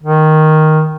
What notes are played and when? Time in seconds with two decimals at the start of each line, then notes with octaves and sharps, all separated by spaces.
0.03 D#3